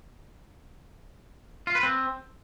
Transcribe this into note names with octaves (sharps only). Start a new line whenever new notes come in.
F4
B4
C4